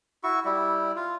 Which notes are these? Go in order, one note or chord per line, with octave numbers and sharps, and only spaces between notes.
E4 F#4 C#6
G3 E4
F4